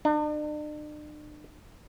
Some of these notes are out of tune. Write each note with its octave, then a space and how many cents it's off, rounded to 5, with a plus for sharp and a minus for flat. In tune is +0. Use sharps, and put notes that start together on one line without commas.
D4 +40